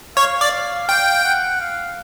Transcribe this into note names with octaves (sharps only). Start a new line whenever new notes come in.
C#5 F5
D5
F5
F5 G5
F#5
F5